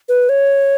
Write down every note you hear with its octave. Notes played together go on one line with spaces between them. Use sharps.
B4
C#5